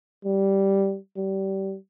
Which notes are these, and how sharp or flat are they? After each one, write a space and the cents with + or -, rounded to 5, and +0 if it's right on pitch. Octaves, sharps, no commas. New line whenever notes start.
G3 -5
G3 -25